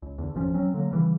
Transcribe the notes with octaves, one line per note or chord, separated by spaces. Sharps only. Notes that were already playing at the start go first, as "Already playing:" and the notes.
C#2
E2 D3
G#1 F2 F3 C#4
E1 F#3 C4 C#4
D3 F#3 A#3
C#3 E3 G3